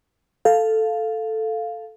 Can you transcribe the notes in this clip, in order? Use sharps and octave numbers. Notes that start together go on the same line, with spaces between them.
A4 F5